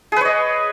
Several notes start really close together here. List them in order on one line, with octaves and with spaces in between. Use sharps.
G#4 B4 C#5 D#5